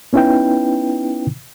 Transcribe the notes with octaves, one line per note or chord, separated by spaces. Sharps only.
B3 C#4 D#4 E4 B4 G5